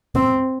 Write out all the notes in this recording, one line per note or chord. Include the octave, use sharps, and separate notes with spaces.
C4